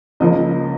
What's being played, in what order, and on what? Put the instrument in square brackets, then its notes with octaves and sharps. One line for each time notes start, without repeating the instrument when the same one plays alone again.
[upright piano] C#2 C#3 F3 A#3 D#5